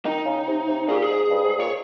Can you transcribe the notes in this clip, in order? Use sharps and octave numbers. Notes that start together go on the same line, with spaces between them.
D#3 D#4
C#3
C3
C3
A#2 G#4
G4
G#4
G#2
G2
G#2
A#2 C#5